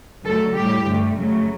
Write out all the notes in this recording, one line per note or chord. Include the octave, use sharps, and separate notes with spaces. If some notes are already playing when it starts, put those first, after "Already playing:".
F#2 D3 F#3 A3 A4
A2 G3 G4
G2 D3 A3
F#2 C#3 F#3 A3